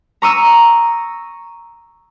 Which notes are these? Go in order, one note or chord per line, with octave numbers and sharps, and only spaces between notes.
A#5 C#6 D#6 E6